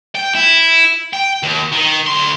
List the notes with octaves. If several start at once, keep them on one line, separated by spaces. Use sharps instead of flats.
G5
E4
G5
D#2
D#3
D2 C6